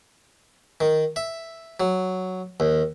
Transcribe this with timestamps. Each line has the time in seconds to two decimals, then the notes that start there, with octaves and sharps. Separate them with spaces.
0.81 D#3
1.16 E5
1.80 F#3
2.60 D#2